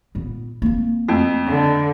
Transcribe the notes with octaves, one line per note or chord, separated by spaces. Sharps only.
A#2 B3
A#3 C4
F2 A3
D3